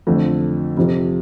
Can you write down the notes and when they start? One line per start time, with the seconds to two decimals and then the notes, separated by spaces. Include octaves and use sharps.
0.07 F2 D3 F3 A3
0.77 F2 C3 F3